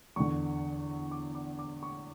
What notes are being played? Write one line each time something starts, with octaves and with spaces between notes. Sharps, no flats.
E2 D3 C#6
D6
D6
D6
C#6